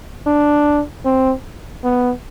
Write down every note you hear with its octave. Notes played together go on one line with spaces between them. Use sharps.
D4
C4
B3